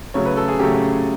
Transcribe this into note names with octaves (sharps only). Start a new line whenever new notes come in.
C#3 F#3 A3 C#5
B4
A4
G#4
C#3 F#3 A3 G4